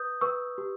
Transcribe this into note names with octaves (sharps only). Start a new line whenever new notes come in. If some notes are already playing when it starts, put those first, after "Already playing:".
Already playing: B4 D#6 G6
B4 C#6 E6
G4